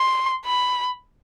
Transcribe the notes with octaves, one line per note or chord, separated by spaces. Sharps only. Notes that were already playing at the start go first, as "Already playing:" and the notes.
Already playing: C6
B5